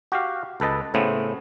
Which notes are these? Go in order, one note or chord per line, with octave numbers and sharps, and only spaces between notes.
F#4 G4 F5
C#2 A4 B4 D#5 A5
A2 C#3 A3 B3 C4